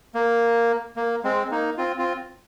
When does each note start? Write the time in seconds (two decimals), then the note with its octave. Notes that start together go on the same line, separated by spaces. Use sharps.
0.15 A#3
0.97 A#3
1.24 G#3 C4
1.51 A#3 D#4
1.78 C4 F4
1.99 C4 F4